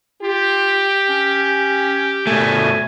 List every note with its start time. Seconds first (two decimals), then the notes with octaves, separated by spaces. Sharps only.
0.22 F4 G4
1.09 C#4
2.27 B2 A3 G#5